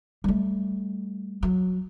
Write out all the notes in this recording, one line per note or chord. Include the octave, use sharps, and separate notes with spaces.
G3 A3
F#3